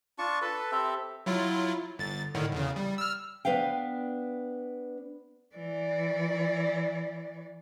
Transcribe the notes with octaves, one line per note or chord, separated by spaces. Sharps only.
D4 F4 A5 C#6
A4 B4 A5
C4 G4 A4 E5
F#3 E4 F4
G1 A6
A2 D3 D#3
E2 C#3
G3
E6 F6
B3 D4 B4 F5 G5
E3 D5